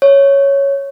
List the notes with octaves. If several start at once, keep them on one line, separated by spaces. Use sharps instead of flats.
C#5